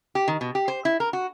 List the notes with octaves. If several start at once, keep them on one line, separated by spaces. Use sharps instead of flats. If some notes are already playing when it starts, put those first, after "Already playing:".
G4
D#3
B2
G4
C5
E4
A#4
F#4